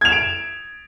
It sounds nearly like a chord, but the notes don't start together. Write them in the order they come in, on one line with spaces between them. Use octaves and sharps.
G#6 F7 E7 D7